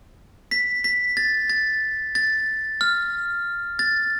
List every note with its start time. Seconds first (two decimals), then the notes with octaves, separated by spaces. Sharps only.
0.51 B6
0.84 B6
1.17 A6
1.50 A6
2.15 A6
2.81 F6
3.79 A6